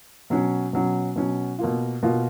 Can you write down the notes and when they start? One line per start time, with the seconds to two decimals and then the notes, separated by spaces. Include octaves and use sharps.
0.30 B2 F#3 C#4
0.73 B2 F#3 C#4
1.16 B2 F#3 C#4
1.59 B2 A#3 F4
2.03 B2 A#3 F4